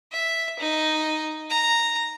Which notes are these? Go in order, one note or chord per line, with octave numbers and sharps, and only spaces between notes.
E5
D#4
A#5